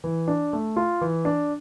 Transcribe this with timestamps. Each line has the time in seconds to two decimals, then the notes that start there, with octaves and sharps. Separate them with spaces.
0.04 E3
0.28 D4
0.53 A3
0.76 F4
1.01 E3
1.25 D4